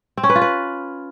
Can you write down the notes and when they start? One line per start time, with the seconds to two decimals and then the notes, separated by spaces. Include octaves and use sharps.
0.17 C4
0.23 C#4
0.30 B4
0.36 F4
0.42 B4